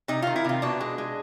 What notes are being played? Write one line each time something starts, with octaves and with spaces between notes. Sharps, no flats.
C3 D#4
D#3 F4
E4
C3 F4
B2 D4
G#3
G#3